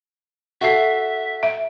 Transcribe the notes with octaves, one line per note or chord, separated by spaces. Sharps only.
F#4 A4 E5 C7
E5